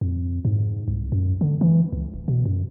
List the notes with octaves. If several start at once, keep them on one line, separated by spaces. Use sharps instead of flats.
F2
G#2
C2
F#2
D3
E3
C#2
D1
B2
F#2